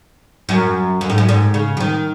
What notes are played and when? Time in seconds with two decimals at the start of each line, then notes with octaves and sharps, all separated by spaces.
0.49 F#2
1.01 F#2
1.10 G#2
1.18 F#2
1.29 G#2
1.54 C#3
1.77 F#3
1.80 D#3